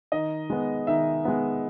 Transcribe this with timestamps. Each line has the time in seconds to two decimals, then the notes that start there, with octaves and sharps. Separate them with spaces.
0.12 D#3 D#5
0.50 G#3 B3
0.87 D#3 E5
1.25 G#3 B3